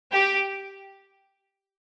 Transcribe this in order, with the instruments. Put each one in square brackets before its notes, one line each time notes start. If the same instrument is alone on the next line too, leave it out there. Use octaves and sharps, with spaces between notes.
[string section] G4